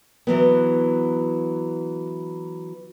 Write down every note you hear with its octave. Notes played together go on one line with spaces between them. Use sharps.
E3 F#3 B3